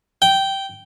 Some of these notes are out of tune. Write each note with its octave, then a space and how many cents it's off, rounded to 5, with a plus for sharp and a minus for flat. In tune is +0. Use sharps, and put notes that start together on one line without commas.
G5 -10